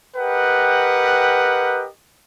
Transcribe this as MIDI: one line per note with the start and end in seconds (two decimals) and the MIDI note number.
0.17 1.87 67
0.17 1.87 70
0.17 1.87 71
0.17 1.87 75
0.17 1.87 78
0.17 1.87 79